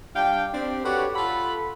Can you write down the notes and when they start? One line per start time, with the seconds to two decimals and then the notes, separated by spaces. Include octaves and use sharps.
0.15 G3 D4 F5 G5
0.53 C4 D4 G4
0.84 F#4 G4 A4 B4 C#5 D5
1.15 F4 A4 F#5 B5